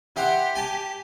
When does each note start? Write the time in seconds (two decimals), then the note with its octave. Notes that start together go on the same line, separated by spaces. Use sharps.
0.16 E4 G4 C5 F#5
0.55 G#5 A5